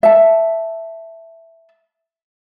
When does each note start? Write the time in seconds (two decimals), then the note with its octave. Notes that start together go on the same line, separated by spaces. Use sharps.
0.03 E5 A5